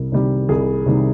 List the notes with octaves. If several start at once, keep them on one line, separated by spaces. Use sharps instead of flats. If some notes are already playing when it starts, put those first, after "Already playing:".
Already playing: C2 C3 G3
C3 D#3 G3
C2 G#4
C3 D#3 G3